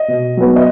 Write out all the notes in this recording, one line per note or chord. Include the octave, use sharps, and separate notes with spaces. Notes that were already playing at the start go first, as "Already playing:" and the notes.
Already playing: D#5
B2
F#3 B3
D#5